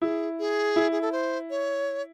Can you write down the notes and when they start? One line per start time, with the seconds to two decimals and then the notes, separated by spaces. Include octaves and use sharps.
0.02 E4 G#4
0.39 G#4
0.76 E4
0.92 G#4
1.01 A4
1.12 C5
1.50 C#5